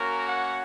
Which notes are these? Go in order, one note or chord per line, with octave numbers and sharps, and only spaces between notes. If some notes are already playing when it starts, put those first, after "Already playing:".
Already playing: A#3 C#4 F#4 A#4
F#5